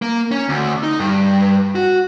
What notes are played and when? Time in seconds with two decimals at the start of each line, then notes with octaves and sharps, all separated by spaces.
0.02 A#3
0.31 C#4
0.49 D2
0.83 D#4
1.00 G2
1.75 F#4